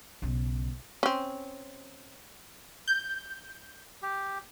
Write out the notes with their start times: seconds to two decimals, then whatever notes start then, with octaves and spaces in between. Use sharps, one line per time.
0.22 B1 C#3
1.03 C4 C#4
2.88 G6
4.02 G4